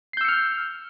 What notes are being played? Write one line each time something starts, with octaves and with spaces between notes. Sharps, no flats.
E6 F6 G6 C7 C#7